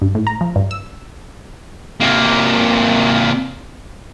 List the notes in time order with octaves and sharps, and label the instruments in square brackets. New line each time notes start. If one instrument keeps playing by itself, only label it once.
[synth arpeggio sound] G2
A2
A#5
F3
G2
E6
[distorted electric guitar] C3 A#3